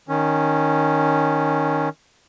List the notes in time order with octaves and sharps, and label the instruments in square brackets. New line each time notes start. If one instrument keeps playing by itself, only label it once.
[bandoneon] D#3 C#4